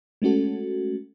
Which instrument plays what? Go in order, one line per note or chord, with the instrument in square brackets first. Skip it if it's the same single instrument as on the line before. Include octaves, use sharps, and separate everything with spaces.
[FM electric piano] G#3 A3 C#4 F#4 A4